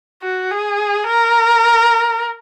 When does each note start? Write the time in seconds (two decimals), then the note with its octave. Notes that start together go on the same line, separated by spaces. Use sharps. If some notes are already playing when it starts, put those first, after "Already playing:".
0.23 F#4
0.51 G#4
1.07 A#4